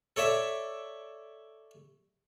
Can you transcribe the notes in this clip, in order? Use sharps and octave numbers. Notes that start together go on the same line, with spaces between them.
A4 C#5 D5 E5